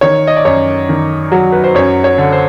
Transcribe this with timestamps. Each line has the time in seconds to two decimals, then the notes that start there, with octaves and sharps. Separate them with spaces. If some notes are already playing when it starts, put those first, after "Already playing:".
0.01 D#3 C#5
0.27 D#5
0.36 D5
0.45 F#2 C#5
0.89 D#3
1.32 F#3
1.52 B4
1.64 C5
1.75 F#2 C#5
2.04 C#5
2.18 D3
2.32 C5